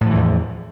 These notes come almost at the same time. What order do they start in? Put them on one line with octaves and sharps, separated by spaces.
A2 F3 E3 E2